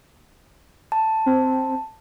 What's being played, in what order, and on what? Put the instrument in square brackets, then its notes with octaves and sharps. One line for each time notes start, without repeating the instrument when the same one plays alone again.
[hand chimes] A5
[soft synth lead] C4